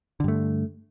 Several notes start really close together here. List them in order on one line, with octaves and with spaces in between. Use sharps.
D3 G2 A3